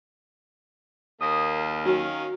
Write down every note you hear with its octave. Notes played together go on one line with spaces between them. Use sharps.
D#2 A#3 D#6
A#4
D#3 F#3 C#4 F5